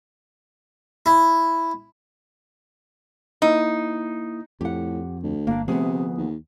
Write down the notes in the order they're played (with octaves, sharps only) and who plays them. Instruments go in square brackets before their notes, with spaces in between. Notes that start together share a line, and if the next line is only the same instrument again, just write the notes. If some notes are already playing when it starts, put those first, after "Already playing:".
[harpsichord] E4
[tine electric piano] A#3 E4 D#6 [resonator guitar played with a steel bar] D#4
[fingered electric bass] F2 [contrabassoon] A2 [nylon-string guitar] G4 F#5
[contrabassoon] D2
[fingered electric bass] G1 [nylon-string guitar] A#3 D4
[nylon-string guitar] D2 G#4 [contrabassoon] C3 [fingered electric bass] F3 B3
[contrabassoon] D#2